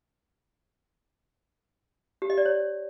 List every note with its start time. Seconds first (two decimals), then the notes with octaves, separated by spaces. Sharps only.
2.22 G4
2.30 D#5
2.38 D5
2.45 C#5